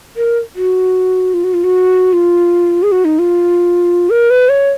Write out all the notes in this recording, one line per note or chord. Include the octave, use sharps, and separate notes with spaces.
A#4
F#4
F4
F#4
F4
F#4
F4
G#4
F#4
D#4
F4
A#4
B4
C#5